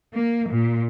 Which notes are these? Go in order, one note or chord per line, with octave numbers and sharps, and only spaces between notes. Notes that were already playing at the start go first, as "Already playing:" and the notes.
A#3
A#2